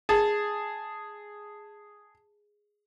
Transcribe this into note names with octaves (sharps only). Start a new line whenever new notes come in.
G#4 A5